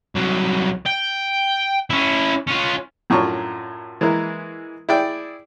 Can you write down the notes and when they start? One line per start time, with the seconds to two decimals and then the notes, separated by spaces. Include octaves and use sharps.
0.15 C2 F#3
0.86 G5
1.90 C#4 E4
2.48 C#4 F4
3.10 F#2 A2 F#3 D4 F4 C#6
4.01 E3 G#3 A#3 E4
4.89 E4 G#4 D5 G5